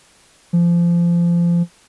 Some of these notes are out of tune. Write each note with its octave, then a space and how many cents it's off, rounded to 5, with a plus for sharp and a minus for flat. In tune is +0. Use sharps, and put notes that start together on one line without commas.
F3 -25